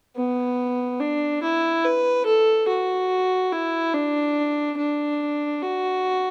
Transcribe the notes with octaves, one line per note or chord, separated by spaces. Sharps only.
B3
D4
E4
B4
A4
F#4
E4
D4
D4
F#4